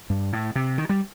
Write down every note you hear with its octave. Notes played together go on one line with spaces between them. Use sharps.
G2
A2
C3
D#3
G3